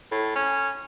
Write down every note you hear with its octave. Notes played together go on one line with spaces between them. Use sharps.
A2
C#4